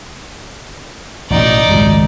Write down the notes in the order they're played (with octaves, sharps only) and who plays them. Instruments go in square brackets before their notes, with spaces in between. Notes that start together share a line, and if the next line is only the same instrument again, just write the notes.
[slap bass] A1 B2 [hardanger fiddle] D#4 D5
[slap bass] G#1 C#2 F#2